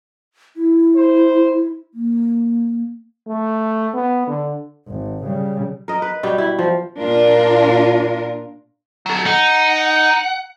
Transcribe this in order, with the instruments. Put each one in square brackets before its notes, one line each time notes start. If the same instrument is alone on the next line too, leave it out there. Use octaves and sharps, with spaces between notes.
[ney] E4
[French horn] C5
[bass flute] A#3
[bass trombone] A3
B3
D3
[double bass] G#1
C#3 G3
[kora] A#4 D#5
B4
B2 G3 G4
E4
F3
[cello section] A#2 D4 F4 A#4
[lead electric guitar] F#3 A4
[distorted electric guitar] D#4 [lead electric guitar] F#5